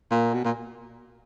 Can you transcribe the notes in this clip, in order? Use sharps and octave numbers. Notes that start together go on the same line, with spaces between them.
A#2
B2
A#2